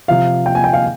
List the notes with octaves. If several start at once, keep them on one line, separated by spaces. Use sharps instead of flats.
C3 F3 F5
G5
G#5
G5
F5